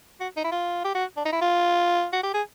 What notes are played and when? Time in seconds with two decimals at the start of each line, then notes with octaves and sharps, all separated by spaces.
0.20 F#4
0.37 D#4
0.45 E4
0.52 F4
0.85 G4
0.95 F#4
1.17 D4
1.25 D#4
1.33 E4
1.41 F4
2.13 F#4
2.23 G4
2.34 G#4